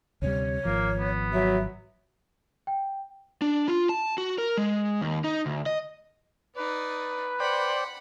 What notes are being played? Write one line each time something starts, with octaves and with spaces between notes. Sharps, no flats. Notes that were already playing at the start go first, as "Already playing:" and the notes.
D2 C3 G3 C#5
G#1 F3 A#3
B3
F#3 E5
G5
D4
F4
A5
F#4
A#4
G#3
D#2
D#4
D2
D#5
D#4 B4 D5
C5 D5 F#5 G5 B5